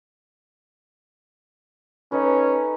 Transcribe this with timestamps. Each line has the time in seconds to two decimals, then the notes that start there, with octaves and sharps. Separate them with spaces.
2.12 C#4 D#4 A4 B4